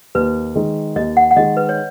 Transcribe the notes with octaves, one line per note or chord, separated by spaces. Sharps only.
D#2 B4
D#3 G#3
D#2 D#5
F#5
F#5
D#3 G#3 D#5
B4
C#5